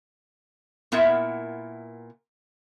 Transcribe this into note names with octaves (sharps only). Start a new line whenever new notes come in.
A#2 B3 E4 A#4 E5 F#5